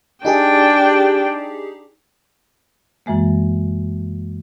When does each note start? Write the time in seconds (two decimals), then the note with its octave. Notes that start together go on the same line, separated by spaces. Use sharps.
0.25 D4 D#4 G4 G#4 G5
3.06 F#2 E3 G#3 A#3